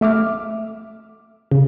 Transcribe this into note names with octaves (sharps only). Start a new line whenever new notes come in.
A3 E5 D6 F6
C#3